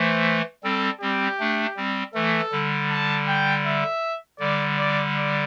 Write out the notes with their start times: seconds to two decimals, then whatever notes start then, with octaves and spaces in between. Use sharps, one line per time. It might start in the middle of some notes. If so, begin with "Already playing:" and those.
Already playing: E3 A3 C5
0.64 G3 C4 A4
1.01 G3 C4 G4
1.40 A3 D4
1.77 G3 C4
2.14 E3 A3 A4
2.52 D3 G3
2.90 A5
3.28 G5
3.65 E5
4.39 D3 G3 D5
4.78 D5
5.16 D5